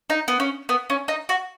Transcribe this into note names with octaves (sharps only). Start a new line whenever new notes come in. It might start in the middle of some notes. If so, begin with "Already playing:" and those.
D#4
B3
C#4
B3
C#4
D#4
F#4